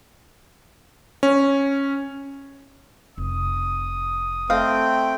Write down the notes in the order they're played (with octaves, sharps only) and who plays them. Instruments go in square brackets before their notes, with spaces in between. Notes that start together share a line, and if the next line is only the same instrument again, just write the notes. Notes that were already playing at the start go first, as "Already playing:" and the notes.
[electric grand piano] C#4
[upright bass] F1 [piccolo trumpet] D#6
[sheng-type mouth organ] A3 C4 G5 [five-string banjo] D#5 F5